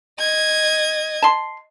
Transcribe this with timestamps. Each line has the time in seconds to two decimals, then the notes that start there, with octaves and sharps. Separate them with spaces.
0.20 D#5 G#6
1.22 A5 C6